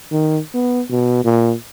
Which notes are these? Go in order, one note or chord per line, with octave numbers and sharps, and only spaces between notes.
D#3
B3
B2
A#2